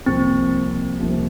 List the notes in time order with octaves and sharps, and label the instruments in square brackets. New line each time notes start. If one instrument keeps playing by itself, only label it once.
[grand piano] C2 C3 F3 A#3 [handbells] C4
[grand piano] C2 C3 F3 A#3